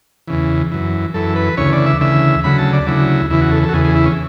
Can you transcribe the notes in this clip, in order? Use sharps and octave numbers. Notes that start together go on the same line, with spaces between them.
E2 C#3 E3
F#2 E3
F#2 E3 A4
B4
D2 C#3 E3 C#5
D5
E5
D2 C#3 E3 E5
D2 C#3 F#3 B5
A5
D5
D2 C#3 F#3 E4
E2 C#3 E3 E4
F#4
A4
A4
F#4
E2 C#3 E3 G#4
G#4
E4
C#4